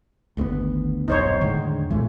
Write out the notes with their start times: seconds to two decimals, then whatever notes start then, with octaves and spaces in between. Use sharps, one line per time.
0.37 G1 D2 D#3 G#3 B3
1.08 D#1 B1 G2 D#4 C5 C#5
1.41 E2 A2 D3 D#3 G#3
1.90 A#2 E3 G#3 A3 B3